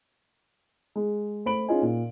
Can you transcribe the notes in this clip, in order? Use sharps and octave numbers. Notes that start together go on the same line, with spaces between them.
G#3
A3 C5 B5 D7 F#7
C#4 D#4 F4 G#4 D#5 G#5
A#2